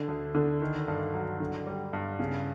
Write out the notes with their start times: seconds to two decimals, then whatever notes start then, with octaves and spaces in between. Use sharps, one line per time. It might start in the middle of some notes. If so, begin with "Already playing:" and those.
Already playing: D3
0.08 D2
0.35 D3
0.62 D#3
0.88 G2
1.14 F#3
1.40 D3
1.67 G3
1.93 G2
2.19 C#3